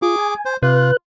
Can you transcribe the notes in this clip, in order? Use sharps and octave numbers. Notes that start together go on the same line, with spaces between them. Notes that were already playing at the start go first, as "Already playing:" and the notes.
F4 G#4 D6
G#5
C5
C3 F4 B4 F#6